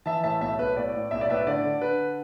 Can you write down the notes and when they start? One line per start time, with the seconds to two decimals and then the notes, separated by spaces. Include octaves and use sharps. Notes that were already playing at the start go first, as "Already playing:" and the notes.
0.06 E3 E5 A5
0.23 A2 E5 A5
0.41 B1 E5 A5
0.59 B1 B4
0.77 A2 D5
0.95 A2
1.11 B1 E5
1.21 D5
1.29 A2 B4 E5
1.47 D3 D5
1.64 D3
1.81 D3 B4